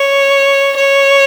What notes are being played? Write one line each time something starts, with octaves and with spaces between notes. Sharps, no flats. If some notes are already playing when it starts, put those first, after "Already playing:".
Already playing: C#5
C#5